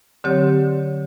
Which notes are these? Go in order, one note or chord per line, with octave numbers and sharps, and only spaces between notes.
D3 F#3 C4 G4 C#5